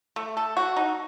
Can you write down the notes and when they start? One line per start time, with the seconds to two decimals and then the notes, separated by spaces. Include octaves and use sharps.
0.16 A3
0.37 A4
0.57 F#4
0.77 D#4